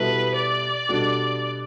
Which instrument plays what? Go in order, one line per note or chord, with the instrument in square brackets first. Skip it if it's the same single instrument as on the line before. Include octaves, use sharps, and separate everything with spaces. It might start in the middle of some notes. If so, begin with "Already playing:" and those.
Already playing: [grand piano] B2 G3 B3 E4 A4 [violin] B4
[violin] D5
[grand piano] B2 G3 D4 A4